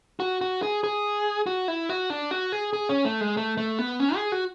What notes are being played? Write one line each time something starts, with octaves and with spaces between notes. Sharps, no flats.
F#4
F#4
G#4
G#4
F#4
E4
F#4
D4
F#4
G#4
G#4
C#4
A3
G#3
A3
A3
B3
C#4
G#4
F#4